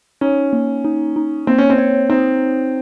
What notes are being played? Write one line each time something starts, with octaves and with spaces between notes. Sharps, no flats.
C#4 D#4
A#3
D#4
D#4
A#3 C4
C#4
C4
C#5
C4 D#4